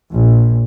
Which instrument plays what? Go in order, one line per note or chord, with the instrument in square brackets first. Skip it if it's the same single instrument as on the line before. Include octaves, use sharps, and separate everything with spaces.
[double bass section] A#1